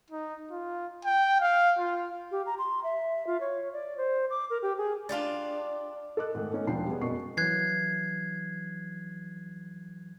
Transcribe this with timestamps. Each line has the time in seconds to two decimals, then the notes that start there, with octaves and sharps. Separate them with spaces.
0.10 D#4
0.51 F4
1.05 G5
1.40 F5
1.79 F4
2.31 G4
2.46 A#5
2.58 C6
2.84 E5
3.27 F4
3.40 C#5
3.73 D5
3.97 C5
4.30 D6
4.50 A#4
4.62 G4
4.78 G#4
5.09 D4 F4 G4 D5
6.17 A4 D#5 D6 F#6
6.35 G#2 D#3 A3
6.51 A3 B3 C#4 D#4
6.67 E1 F3 D4 G5 C7
6.87 G3 B3 G#4
7.01 F#2 B2 G#3 A#4 C#6 C7
7.37 E3 F#3 F#6 G#6 C7